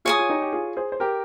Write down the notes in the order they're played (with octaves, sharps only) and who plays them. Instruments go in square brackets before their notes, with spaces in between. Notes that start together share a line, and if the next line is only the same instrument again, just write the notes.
[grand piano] F4 G#4 [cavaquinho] C#5 G#5 D#6
[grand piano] F4
D#4 G4
G4
F4 G#4
G#4 C5
C5
G4 A#4